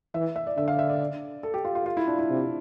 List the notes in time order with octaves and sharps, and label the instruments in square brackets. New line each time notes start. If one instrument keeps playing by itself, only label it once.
[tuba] E3 [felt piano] E5
[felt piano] E5
D5
[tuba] D3 [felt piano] E5
[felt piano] F5
E5
D5
A4
G4
F4
F4
F4
E4
D4
E4
[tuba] C3